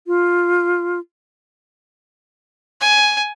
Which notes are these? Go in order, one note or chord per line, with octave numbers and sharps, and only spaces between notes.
F4
G#5